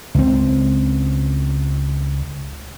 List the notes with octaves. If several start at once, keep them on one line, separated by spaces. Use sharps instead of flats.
C#2 C4